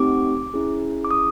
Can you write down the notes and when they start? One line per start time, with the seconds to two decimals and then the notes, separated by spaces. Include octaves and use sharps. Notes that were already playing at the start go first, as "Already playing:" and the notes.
Already playing: A3 C4 D#4 G4 D6
0.54 C#4 E4 G#4
1.05 D6
1.11 D#6